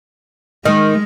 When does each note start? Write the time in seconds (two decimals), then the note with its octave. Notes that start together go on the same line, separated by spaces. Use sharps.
0.65 D#3 G#3 D#5